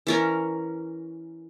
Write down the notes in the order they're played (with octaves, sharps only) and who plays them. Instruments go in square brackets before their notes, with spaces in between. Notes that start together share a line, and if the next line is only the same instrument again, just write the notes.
[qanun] E3 C#4 A#4